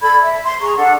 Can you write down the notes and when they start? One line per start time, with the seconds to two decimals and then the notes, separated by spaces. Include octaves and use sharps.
0.01 A4 D5 B5 G#6
0.20 E5
0.44 C6
0.60 G#4 A#5 C#6
0.77 D4 A4 F#5